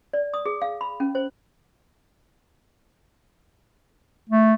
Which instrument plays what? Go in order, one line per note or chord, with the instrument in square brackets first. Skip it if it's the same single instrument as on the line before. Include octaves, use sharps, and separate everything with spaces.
[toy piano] D5
D#6
G#4
F5
B5
C#4
C5
[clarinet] A3